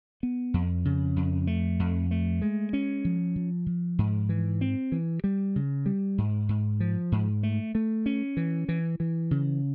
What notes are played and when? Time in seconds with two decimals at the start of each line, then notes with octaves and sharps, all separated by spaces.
0.23 B3
0.54 F2
0.85 C#3
1.16 F2
1.47 A3
1.79 F2
2.11 A3
2.42 G#3
2.73 C#4
3.05 F3
3.36 F3
3.66 F3
3.98 G#2
4.29 E3
4.61 C4
4.92 E3
5.24 G3
5.56 C#3
5.86 G3
6.18 G#2
6.49 G#2
6.80 F3
7.12 G#2
7.43 A3
7.75 A3
8.06 C#4
8.37 E3
8.69 E3
9.00 E3
9.31 C#3